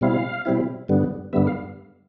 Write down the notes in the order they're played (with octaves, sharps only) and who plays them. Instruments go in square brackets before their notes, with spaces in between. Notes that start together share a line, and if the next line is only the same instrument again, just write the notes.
[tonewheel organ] B2 G3 C4 E4 F5
B2 G3 C4 E4
G2 D3 G3 B3
G2 D3 G3 B3 E5
F5